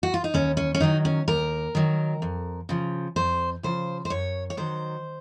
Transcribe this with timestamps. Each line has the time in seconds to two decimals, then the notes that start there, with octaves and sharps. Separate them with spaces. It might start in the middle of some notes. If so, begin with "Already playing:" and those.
0.03 F#4
0.14 F4
0.24 D#4
0.34 D#2 C#4
0.57 C#4
0.75 C#4
0.80 D#3 F#3 D#4
1.05 C#4
1.28 D#2 A#4
1.75 D#3 F#3
2.22 F2
2.69 C#3 F3
3.16 F2 C5
3.63 C#3 F3 C5
4.05 C5
4.10 F#2 C#5
4.50 C#5
4.57 D#3 F#3 C5